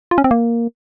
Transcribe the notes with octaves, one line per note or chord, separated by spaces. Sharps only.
F4
C#4
C4
A#3